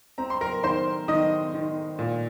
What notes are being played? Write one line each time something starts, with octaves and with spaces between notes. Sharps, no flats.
C4 A#5
C6
A#4 A#5
D#3 C5 C6
D#3 D#5 D#6
D#3
A#2